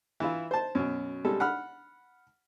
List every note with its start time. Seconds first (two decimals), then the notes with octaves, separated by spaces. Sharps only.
0.20 E3 E4 F4
0.51 C5 A5
0.75 F#2 B2
1.25 C3 G3 G#3 A4
1.40 F#5 B5 F6